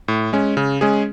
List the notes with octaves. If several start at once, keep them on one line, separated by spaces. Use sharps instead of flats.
A2
G#3 C#4
C#3
G#3 C#4 G#4